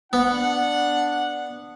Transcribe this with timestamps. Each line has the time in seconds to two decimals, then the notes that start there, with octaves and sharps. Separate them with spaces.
0.13 B3 D4 F#5